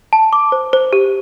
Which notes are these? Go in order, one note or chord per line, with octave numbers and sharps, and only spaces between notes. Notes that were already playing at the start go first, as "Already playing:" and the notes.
A5
D6
C5
C5
G4